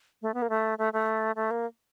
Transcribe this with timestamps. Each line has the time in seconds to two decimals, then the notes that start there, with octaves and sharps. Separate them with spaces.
0.22 A3
0.34 B3
0.42 A#3
0.50 A3
0.78 A3
0.93 A3
1.36 A3
1.51 A#3